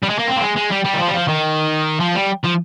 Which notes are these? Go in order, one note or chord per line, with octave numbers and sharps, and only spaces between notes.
G3
G#3
A#3
C4
A#3
G#3
G#3
G3
G3
D#3
F3
G3
F3
D#3
F3
G3
F3